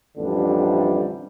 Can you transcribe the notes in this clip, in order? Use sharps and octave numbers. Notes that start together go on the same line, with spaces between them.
A1 F2 D3 G3 D4